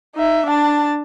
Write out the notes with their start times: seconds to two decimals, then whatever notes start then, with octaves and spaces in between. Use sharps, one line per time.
0.16 D#4 E5
0.46 D4 A5